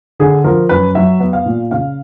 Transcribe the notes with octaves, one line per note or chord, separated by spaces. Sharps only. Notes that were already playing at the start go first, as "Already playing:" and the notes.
D3 G#4
F3 A#4
F#2 B4
F#3 E5
B3
F5
A#2
C#3 F5